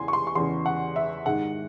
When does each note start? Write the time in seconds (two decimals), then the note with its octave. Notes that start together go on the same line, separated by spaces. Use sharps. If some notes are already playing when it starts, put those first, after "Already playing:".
Already playing: E2 C#3 E3 G#5 C6
0.08 C#6
0.13 C6
0.27 C#6
0.35 E2 C#3 E3 C6
0.66 F#5
0.96 E5
1.26 G#2 D#3 G#3 F#5